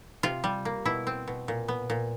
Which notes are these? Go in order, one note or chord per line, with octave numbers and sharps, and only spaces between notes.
C3 F4
G3
A#3
B2 E4
C4
B2
A#2
B3
A#2